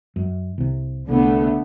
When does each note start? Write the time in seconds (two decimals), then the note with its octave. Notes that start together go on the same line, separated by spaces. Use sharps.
0.16 F#2
0.58 C2 C3
1.08 C2 D3 A3 B3